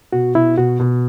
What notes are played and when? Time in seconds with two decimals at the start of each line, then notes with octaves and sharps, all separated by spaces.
0.13 B2 F#4
0.35 B2 E4
0.57 B2 F#4
0.80 B2